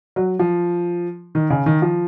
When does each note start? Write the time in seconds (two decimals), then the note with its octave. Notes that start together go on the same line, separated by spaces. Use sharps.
0.16 F#3
0.39 F3
1.35 D#3
1.50 C#3
1.66 D#3
1.82 F3